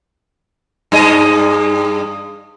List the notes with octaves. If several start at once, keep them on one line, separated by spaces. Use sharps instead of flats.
G2 G#4 D#5